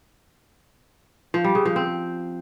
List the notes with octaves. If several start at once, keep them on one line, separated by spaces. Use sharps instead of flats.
F3
G3
C#3
F3
C4